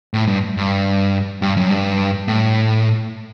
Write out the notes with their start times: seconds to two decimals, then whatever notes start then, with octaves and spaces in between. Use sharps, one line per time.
0.14 A2
0.27 G2
0.57 G2
1.42 G2
1.57 F#2
1.70 G2
2.28 A2